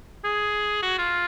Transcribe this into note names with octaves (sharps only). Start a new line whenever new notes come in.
G#4
F#4
F4